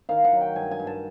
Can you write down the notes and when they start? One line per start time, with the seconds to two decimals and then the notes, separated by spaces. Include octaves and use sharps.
0.09 D#3 F5
0.24 F#5
0.32 F#3
0.41 G5
0.56 G2 G#5
0.71 G#5
0.79 G2
0.87 A5